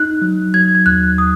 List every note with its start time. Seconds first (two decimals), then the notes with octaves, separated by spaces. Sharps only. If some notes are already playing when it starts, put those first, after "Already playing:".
Already playing: D#4 F#6
0.22 F#3
0.54 F#3 G#6
0.75 G#6
0.86 D#2 F#6
1.18 D#6